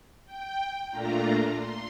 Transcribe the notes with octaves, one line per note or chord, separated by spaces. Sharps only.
G5
A#2 A3 D4 F4 A#5
C6